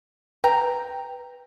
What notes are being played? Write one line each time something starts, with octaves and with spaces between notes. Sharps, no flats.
B4 G5 A#5